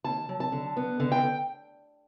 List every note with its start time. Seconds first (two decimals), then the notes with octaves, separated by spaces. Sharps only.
0.04 D#2 A5
0.29 F#3
0.40 A5
0.52 D3
0.77 B3
1.00 D3
1.12 G5